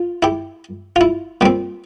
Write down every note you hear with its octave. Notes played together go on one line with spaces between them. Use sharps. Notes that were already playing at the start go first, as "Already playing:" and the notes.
Already playing: F4
E4 G4
F4
E4
A#2 G3 C4